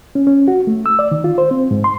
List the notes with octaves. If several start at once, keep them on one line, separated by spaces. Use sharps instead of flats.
C#4
C#4
F#4
A3
E6
D5
D#3
F4
C5
C4
G#2
C6